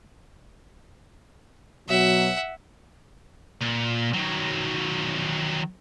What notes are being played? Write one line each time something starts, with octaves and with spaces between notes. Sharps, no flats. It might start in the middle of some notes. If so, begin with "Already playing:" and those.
B2 F#3 E5 F#5
A#2
D#3 F#3